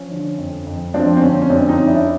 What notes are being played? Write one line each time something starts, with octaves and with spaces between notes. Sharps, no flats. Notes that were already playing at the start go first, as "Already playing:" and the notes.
Already playing: F3 C#4
D3
F2
F2
F3 C4 D4
C4
D3 C#4
C#4
F2 C4 D4
C#4 D#4
F2
D4 E4